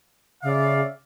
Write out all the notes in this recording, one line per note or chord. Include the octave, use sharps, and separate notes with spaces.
C#3 D5 E5 F5